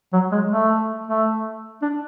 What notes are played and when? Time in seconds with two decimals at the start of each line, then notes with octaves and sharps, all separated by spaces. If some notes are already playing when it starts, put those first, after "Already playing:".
0.13 F#3
0.32 G#3
0.51 A3
1.07 A3
1.82 D4